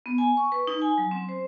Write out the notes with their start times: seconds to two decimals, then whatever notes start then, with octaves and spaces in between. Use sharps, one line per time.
0.06 B3
0.18 G#5
0.37 C#6
0.52 B4
0.67 D#4
0.82 G#5
0.98 F#3
1.11 C4
1.29 C5